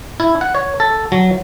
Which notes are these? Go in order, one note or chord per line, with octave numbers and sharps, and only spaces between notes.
E4
F#5
C#5
A4
F#3